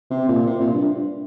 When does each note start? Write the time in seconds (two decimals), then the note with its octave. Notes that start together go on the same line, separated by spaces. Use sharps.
0.11 C3
0.29 A#2
0.47 C3
0.60 A#2
0.73 G2